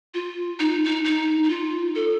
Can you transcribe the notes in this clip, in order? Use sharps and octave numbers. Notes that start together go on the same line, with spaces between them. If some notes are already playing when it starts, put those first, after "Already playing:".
F4
D#4
D#4
D#4
D#4
F4
A4